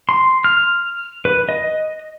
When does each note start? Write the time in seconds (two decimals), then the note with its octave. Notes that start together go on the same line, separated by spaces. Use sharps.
0.09 C6
0.44 F6
1.25 B4
1.49 D#5